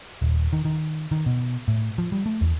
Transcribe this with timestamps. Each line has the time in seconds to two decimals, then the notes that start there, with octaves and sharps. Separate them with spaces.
0.22 D#1
0.53 D#3
0.65 D#3
1.11 D#3
1.26 B2
1.68 A2
1.98 F3
2.12 G3
2.26 A3
2.41 E2